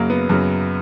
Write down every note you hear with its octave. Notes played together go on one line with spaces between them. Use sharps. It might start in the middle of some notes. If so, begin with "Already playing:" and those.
Already playing: F#2 C#3 F#3 A#3
B3
F#2 C#3 F#3